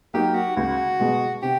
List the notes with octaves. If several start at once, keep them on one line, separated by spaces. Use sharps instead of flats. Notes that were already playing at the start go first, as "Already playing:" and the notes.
F#3 A#3 D#4 G4
F#4
C#2 F#4
B2 G#3
C3 G4